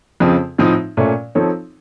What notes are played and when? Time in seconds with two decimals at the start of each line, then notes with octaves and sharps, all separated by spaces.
0.20 F2 C#3 F3 C4
0.58 A2 F3 C4 D#4
0.97 A#2 A3 C#4
1.35 F3 C4 D#4 A4 C#5